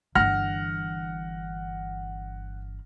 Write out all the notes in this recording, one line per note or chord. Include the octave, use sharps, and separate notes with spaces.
G1 E3 F#5 F6 A#6